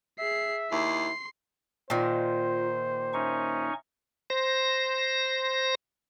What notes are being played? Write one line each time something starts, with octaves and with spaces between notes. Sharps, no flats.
G#4 E5 C7
D#2 E4 C6 C7
A#2 D#3 F4 C5
C#4 D#4 E5 C#6
C5 A#6